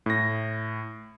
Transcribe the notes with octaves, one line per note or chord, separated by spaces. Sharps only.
A2 A#6